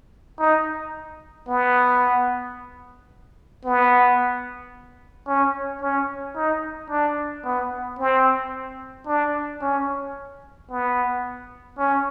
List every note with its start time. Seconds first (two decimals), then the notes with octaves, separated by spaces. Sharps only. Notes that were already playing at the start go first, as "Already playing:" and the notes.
0.40 D#4
1.48 B3
3.65 B3
5.28 C#4
5.82 C#4
6.36 D#4
6.90 D4
7.45 B3
7.99 C4
9.07 D4
9.62 C#4
10.70 B3
11.78 C#4